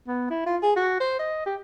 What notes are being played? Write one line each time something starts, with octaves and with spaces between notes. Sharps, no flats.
B3
E4
F4
G#4
F#4
C5
D#5
G4